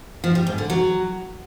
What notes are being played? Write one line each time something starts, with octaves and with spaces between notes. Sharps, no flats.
F3
G3
G#2
D3
F#3